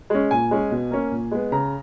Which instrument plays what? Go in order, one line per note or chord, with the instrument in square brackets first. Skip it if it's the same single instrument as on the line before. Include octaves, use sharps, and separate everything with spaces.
[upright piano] G#3 C#4
A#2 G#5
G#3 C#4
B2
A#3 C#4
A#2
G#3 B3
C#3 A#5